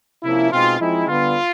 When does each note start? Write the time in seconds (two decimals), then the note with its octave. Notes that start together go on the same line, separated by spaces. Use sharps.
0.24 C3 F3 A#3 C#4 E4
0.52 B2 G#3 C4 D#4 F4
0.80 F3 G#3 C4 D#4 E4
1.07 D3 G3 B3 F4